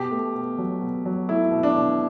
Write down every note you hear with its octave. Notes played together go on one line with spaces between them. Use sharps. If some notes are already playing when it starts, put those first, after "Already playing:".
Already playing: B2 G4
A3
B2
F#3
B2
F#3
A3 E4
B2
D4
B2